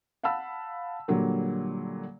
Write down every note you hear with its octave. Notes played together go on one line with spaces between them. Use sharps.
F5 F#5 A5 B5 E6
A#2 D3 F#3 G3 A#3